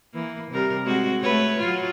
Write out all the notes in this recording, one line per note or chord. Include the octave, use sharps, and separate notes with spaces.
E3 A#3
C3 G3 A#4
G#3 C4 F#4
A3 B4 C#5
F#3 F4